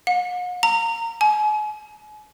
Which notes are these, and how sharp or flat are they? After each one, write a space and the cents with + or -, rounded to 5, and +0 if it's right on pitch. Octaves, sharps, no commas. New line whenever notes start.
F#5 -45
A#5 -25
G#5 +40